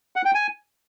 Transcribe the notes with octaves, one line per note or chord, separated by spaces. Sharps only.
F#5
G5
G#5